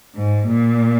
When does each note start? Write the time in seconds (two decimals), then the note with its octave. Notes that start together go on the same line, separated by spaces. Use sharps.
0.15 G#2
0.47 A#2